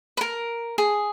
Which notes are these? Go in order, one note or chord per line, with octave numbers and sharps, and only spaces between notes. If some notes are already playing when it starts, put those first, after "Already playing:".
B4
A#4
G#4